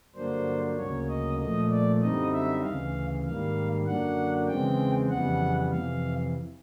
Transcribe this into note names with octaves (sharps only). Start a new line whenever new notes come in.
G2 D3 F#3 A#3 D4 C5
D2 C#3 F#3 A#3 C#5
D#5
A#2 F3 A3 D#5
D5
F#2 D3 G3 C4 D#4 D#5
E5
D2 C#3 E3 F5
G#2 D#3 G3 A#3 F5
F#2 D3 F#3 A#3 D4 F#5
E2 C#3 E3 G#3 C4 G5
F2 C#3 E3 G3 B3 F#5
F2 C3 E3 F5